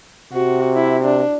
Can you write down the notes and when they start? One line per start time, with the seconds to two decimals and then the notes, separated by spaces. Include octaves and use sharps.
0.33 C3 F#4
0.76 E4
1.04 D4